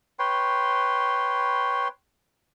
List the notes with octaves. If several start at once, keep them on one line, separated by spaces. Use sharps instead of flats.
B4 C#5 G5 C6